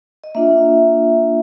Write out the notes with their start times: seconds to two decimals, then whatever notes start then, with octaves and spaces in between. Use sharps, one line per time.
0.24 D#5
0.35 A#3 D4 F4 E5